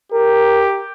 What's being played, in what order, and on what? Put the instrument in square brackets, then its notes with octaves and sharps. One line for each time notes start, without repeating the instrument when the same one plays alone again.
[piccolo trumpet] G4 [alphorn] A#4